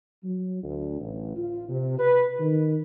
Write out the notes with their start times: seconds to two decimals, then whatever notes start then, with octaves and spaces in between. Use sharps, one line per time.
0.23 F#3
0.62 D2
1.00 A1
1.36 F4
1.68 C3
1.98 B4
2.38 D#3